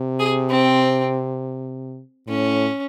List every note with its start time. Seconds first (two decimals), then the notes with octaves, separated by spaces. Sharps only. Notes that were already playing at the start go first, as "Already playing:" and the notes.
Already playing: C3
0.19 G#4
0.49 C4
2.28 A2 C#4